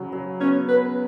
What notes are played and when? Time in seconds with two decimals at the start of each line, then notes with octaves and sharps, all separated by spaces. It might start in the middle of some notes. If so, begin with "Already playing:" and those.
Already playing: C#3 F#3
0.13 F#3
0.40 B3 C#4
0.68 B3 B4